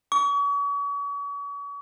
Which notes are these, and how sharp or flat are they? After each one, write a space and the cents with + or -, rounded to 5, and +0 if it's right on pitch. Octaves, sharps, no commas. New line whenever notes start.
C#6 +40